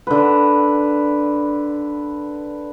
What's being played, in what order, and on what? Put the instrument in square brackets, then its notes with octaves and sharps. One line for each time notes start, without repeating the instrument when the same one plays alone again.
[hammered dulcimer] D3 B4